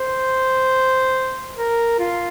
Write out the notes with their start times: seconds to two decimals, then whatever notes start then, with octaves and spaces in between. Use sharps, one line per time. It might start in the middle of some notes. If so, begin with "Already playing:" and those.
Already playing: C5
1.57 A#4
1.99 F4